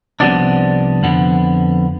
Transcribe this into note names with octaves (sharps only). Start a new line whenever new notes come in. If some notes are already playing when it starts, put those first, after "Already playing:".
C2 C3 F3 B3 D4 D5
F2 D3 F3 B3